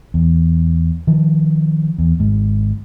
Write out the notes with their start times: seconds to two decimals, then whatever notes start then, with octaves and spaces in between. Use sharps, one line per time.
0.14 E2
1.07 D#3 F3
1.98 E2
2.20 G#1 G#2